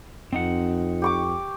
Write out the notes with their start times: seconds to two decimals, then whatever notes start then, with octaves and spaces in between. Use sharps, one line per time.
0.33 F2 C4 D#4 F#5
1.02 G4 C#6 D6